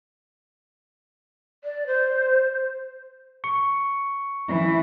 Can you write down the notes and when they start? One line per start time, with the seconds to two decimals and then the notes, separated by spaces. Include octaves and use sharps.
1.64 D5
1.87 C5
3.44 C#6 C#7
4.48 E3